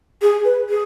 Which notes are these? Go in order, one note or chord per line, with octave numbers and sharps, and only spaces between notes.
G#4
B4
G#4